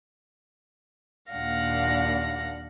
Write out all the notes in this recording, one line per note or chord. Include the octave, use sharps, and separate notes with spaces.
D#2 A#2 D4 F5 F#5 A#6